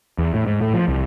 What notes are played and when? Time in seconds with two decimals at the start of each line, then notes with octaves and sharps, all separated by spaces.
0.18 E2
0.34 A2
0.46 G#2
0.61 A2
0.74 F3
0.88 C2